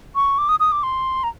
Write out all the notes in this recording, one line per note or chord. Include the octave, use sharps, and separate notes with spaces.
C#6
D6
D#6
D#6
D6
C6
A#5